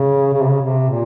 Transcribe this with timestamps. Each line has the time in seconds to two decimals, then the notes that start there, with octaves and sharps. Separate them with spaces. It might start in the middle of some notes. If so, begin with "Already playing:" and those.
Already playing: C#3
0.34 C#3
0.43 C3
0.50 C#3
0.62 C3
0.89 A#2